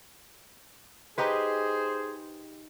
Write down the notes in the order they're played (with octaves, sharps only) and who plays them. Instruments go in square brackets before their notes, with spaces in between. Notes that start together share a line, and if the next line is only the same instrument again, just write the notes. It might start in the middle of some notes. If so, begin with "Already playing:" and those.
[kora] D#4 G4 B4 [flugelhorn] G#4 [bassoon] C5